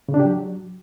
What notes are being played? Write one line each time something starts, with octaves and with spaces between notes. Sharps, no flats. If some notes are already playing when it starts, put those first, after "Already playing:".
C#3
D4
G4
F#3